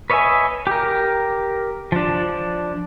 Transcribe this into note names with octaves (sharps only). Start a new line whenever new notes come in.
B4 C#5 D#5 E5 G#5
G4 A#4
F3 D4